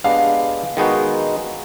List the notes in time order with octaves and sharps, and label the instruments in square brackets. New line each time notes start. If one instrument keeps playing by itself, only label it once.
[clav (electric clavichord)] G#3 B3 D4 G4 [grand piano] F5
[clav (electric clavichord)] D#3 G#3 B3 D#4 F#4